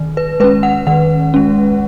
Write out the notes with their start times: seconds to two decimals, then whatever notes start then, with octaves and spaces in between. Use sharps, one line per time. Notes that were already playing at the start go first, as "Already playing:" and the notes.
Already playing: D#3
0.17 B4
0.40 G#3 B4
0.44 C#4
0.63 F#5
0.87 D#3 F#5
1.34 G#3 C#4